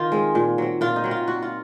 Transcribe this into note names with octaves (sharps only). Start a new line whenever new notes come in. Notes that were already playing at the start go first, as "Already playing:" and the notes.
Already playing: D#3 F4 D#5
G#3 C4
A#2
F#3 C4
A#2 F4
D#4
F#3 C4
F4
A#2 F#4
F4